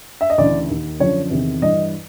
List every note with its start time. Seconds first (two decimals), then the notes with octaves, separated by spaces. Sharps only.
0.21 E5
0.30 D#5
0.38 D2 C#3 E3 D5
0.70 D#2 D#3
0.99 F#2 D3 F3 C#5
1.30 E2 C3 D#3
1.62 G2 E3 D#5